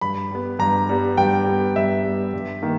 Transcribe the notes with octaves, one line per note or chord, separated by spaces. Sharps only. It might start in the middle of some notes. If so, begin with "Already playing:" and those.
G2 B5
G3 B3
G2 A#5
G3 B3
G2 G5
G3 B3
G2 E5
G3 B3
G2
D#3 A#3